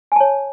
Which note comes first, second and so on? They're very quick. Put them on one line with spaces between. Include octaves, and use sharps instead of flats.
G#5 A5 C#5